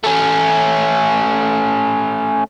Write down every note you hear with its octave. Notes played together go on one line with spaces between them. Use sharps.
A3 C#4